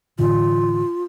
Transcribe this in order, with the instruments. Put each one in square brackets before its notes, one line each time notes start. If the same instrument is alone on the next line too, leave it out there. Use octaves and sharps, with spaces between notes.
[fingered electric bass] A2 D3 E3 [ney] F4